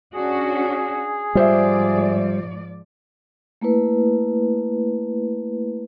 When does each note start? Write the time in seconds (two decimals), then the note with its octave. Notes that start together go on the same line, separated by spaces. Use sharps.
0.14 C#4 D4 F#4 G#4
1.35 G#2 F3 G3 F4 C5 D5 E5
3.61 A3 A#3 E4 B4